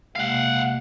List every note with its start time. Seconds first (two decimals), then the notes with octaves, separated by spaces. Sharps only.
0.16 C3 G#3 A#3 F5 F#5